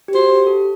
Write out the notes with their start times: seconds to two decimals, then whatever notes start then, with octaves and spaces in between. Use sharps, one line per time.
0.08 G4
0.14 F#4 C5
0.30 G4
0.47 A4